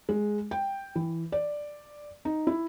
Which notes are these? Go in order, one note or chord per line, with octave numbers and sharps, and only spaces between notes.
G#3
G5
E3
D5
D#4
E4